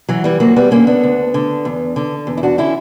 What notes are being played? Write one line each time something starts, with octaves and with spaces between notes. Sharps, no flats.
E3 F#3
E3 G3
D2 F#3 A#3
G3 B3
D3 A#3 C#4
B3 D4
D2
D3
E2
D3
E2
E4
D4 F#4
D3 C#4 E4